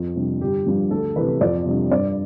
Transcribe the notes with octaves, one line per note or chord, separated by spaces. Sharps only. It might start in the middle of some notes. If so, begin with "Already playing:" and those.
Already playing: F2
C3 G3 D4
G1 G4
G2 F3
D2 A4
C3 E3 B4
F2 D5
C3 G3 D4
G2 D5